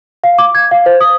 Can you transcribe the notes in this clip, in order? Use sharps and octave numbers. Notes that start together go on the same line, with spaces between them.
F5
D6
G#6
F5
C5
D#6